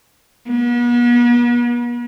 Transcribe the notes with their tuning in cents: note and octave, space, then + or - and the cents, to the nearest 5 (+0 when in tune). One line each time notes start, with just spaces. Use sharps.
B3 -40